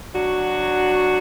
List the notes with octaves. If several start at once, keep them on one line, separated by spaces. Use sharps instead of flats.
F#3 D4 F#4